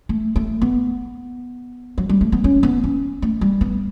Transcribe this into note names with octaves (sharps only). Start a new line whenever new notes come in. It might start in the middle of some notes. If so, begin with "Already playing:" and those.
A3
A3
B3
F#3
G3
A3
B3
C#4
B3
C#4
A3
G3
B3